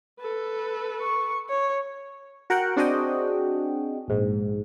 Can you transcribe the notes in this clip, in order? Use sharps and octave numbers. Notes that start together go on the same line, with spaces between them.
A4 B4
C#6
C#5
F#4 A#4 F#5 G5 F#6
C4 D4 F#4 G#4 D#5 G5
A#1 G#2